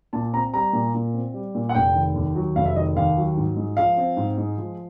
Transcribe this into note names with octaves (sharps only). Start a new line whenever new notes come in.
A#2 A5
C4 A#5
G3 A#5
A#2
A#2
C4
G3
A#2
F#5
F1 G5
D#3
D#2
F#3
F1 F5
E5
D#3 D#5
D#2 F5
F#3
G#2
G#3
F3 F5
C4
G#2
G#3
F3